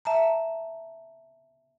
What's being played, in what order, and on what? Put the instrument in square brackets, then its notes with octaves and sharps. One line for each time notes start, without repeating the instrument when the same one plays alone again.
[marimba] E5 A5 A#5